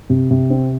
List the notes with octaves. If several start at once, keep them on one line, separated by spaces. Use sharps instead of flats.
C3
C3
C4